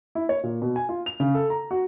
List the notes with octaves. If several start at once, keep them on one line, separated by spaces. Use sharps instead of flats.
E4
C#5
A#2
B2
G#5
F4
F7
C#3
A4
A#5
F#4